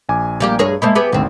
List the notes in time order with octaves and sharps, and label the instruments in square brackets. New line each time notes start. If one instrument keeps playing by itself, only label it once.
[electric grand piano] A#1 G#5 D6
[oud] G3 A#3 G4
[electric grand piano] G2 [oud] G#4 A#4 C#5
[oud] G#3 A#3 C5 [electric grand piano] E5 A5 B5
[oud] B3 G4 G#4
[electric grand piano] G#1 D2 [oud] G3 C4